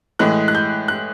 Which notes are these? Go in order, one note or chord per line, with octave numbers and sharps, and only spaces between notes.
A2 E3 G#3 F#6
F#6
G6
F#6